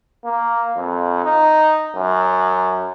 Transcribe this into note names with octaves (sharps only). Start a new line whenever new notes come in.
A#3
F2
D#4
F#2